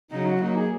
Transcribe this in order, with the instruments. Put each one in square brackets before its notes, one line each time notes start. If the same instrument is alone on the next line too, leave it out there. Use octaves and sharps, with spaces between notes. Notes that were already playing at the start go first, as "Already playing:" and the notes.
[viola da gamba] C#3 F#3 [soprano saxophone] D#4
[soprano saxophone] F#4
[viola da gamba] F#3 A#3 [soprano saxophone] D#4
[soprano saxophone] G#4